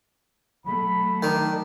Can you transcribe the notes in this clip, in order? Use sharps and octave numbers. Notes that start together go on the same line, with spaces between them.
F#3 A3 B5
D#3 D4